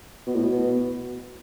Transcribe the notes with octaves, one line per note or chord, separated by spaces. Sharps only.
B2
A2
B2